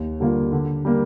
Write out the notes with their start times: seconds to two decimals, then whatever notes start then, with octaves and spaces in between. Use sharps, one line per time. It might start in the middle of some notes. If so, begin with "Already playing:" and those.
Already playing: D#2
0.20 D3 G3 A#3 F4
0.52 D3
0.85 G3 A#3